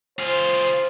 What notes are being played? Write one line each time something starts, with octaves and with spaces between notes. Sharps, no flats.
F4 G#4 C5